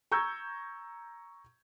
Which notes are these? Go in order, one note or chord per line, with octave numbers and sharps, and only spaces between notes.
A#5 C#6 E6 G6 G#6